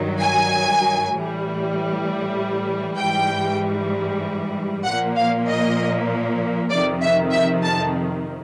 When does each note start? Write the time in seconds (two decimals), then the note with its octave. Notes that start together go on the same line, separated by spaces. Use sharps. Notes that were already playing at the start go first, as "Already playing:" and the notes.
Already playing: G2 D#3 F#3
0.20 G#5
1.13 A2 E3 G3
2.98 G#2 E3 G3 G5
4.85 A#2 F3 A#3 F#5
5.16 F5
5.47 D#5
6.70 F2 C3 D#3 D5
7.01 E5
7.32 E5
7.63 A5